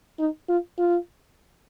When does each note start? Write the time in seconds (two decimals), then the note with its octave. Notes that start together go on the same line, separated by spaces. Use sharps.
0.19 D#4
0.48 F4
0.78 F4